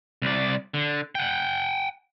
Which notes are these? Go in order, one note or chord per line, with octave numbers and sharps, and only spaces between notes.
C2 D5
D3
F#5 G5